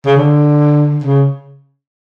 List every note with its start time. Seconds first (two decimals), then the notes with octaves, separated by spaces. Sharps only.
0.06 C#3
0.16 D3
1.04 C#3